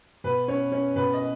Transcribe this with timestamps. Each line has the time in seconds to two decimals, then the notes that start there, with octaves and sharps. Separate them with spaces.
0.24 B2 B4
0.48 C#4 C#5
0.72 C#4 C#5
0.96 B2 B4
1.13 D#5